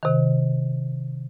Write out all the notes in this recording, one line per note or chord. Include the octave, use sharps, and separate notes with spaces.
C3 D#3